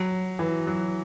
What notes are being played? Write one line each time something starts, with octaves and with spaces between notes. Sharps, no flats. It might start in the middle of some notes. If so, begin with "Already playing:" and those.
Already playing: F#3
E3
F#3